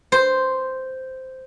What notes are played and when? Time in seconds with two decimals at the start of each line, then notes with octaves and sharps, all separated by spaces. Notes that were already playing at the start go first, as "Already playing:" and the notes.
0.12 C5